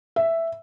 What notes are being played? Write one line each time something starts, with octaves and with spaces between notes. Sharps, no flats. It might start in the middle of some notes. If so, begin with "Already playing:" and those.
E5